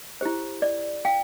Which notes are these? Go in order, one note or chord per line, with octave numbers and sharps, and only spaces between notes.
E4 G4 C5
D5
F5 G5